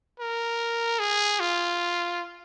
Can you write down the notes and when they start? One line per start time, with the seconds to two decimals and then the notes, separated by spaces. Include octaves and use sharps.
0.20 A#4
1.00 G#4
1.40 F4